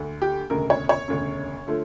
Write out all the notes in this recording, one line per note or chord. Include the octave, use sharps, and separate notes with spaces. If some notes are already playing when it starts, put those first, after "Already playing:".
Already playing: D2 D3 A3
G4
E1 D2 C#3 A#4
C#5
C#5
E1 D2 C#3
D3 F3 A3